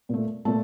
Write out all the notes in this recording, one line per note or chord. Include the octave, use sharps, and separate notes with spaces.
A#2 A3
A#2 A3 A5